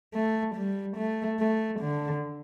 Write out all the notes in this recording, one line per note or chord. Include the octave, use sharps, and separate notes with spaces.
A3
G3
A3
A3
D3